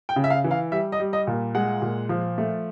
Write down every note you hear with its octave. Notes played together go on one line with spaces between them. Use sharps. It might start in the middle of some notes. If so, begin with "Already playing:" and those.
G5
C#3
E5
F5
E3
F5
G3 E5
D#5
G3
D#5
A#2
G#3 F#5
A#2
F3
A3